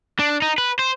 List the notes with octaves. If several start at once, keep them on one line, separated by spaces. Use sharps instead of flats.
D4
D#4
B4
C5